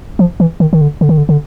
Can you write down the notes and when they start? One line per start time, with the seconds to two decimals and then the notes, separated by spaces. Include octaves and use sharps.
0.19 F3
0.40 E3
0.60 D#3
0.73 D#3
0.81 D3
1.01 D3
1.09 D#3
1.18 D3
1.29 D3